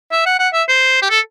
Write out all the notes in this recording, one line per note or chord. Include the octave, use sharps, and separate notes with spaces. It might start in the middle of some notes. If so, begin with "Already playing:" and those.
E5
F#5
F#5
E5
C5
G4
A4